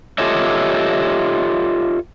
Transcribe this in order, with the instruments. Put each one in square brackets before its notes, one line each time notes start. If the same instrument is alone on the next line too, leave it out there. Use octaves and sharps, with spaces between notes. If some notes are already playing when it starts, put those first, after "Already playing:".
[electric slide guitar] F4 G4 A4 C#5 D#5 E5